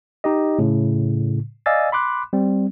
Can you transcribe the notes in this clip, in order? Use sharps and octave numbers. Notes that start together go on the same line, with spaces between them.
D#4 G4 D#5
A2 C#3
D5 D#5 F5 G#5 E6 A6
B5 C6 D6 F#6
G3 C4